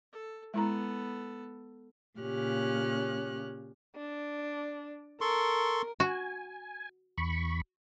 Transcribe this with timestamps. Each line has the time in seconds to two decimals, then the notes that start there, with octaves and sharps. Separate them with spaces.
0.13 A4
0.54 G#3 B3 E4 A4 A#5
2.20 A#2 C#3 C#4 G4 F6 F#6
3.96 D4
5.21 A4 A#4 C6 C#6
6.00 F#4 G#5
7.18 E2 B5 C#6